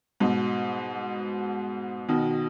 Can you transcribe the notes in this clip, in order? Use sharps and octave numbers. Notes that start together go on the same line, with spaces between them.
G#2 B2
B2 D#3